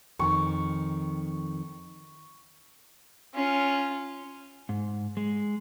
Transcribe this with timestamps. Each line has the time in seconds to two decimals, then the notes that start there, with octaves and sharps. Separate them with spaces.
0.19 F2 D#3 C#6
3.34 C#4 F4
4.69 G#2
5.17 G#3